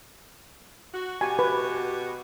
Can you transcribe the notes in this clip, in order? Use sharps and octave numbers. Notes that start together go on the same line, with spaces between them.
F#4
B2 F#4 G4 G#5
B4